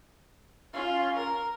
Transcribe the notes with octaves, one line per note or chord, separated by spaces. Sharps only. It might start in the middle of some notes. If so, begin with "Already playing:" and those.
C#4 F4
A#4